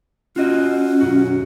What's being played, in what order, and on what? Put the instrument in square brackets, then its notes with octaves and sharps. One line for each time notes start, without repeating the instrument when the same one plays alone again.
[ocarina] C#4 [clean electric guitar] F4 F#4 D#5
[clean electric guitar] B1 F#2 F#4